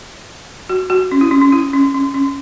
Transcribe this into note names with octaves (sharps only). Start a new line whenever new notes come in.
F#4
F#4
C#4
E4
C#4
C#4
E4
C#4
C#4
C#4